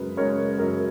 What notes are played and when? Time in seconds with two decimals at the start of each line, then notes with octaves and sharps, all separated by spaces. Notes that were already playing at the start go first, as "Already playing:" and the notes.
Already playing: F#2 C#3 G#3 A#4 B4
0.17 C#3 G#3 A#4 C#5
0.58 F#2 A#4